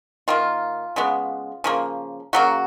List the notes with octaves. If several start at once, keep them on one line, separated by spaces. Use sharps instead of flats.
D#3 A#3 F4
C#3 G#3 B3
C#3 F3 A#3
C#3 F#3 A#3 F#4